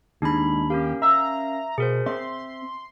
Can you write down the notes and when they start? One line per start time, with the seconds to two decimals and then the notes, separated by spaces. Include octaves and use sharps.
0.22 D#2 G#3 D4 D#4 B5
0.70 C#4 G4 A#4 F5
1.02 E5 A#5
1.78 B2 G#4 A#4 C5
2.06 C4 E5 C6